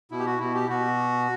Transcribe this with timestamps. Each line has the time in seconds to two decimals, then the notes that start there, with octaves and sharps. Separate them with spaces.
0.11 B2 E4
0.19 G4
0.26 F#4
0.40 B2 E4
0.54 G4
0.69 B2 F#4